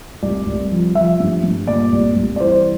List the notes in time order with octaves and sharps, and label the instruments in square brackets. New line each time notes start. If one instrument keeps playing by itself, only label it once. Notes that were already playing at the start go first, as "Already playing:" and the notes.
[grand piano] C2 D5
C2
F3
F3 E5
G2
G2
A#2 D5
C2
C2
D5
E3 C5